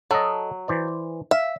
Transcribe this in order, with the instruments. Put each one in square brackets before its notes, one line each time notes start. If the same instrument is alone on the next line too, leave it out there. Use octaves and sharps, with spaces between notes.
[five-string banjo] F#3 [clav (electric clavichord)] A4 D#5
[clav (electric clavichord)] E3 C5 D5
[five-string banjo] E5 [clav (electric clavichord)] F5